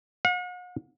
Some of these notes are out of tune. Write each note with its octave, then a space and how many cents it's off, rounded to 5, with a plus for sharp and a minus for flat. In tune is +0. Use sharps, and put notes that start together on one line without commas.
F#5 -45